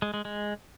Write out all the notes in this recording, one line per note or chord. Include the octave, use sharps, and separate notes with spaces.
G#3
G#3
G#3